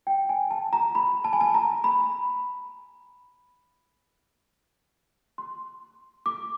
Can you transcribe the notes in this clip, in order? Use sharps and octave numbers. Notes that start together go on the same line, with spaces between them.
G5
G#5
A5
A#5
B5
A5
G#5
A5
A#5
B5
C6
D6